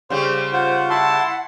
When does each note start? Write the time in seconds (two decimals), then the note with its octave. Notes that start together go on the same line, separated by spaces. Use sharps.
0.10 C#3 G3 C5
0.52 F4 C5 F#5
0.90 E4 A5 C6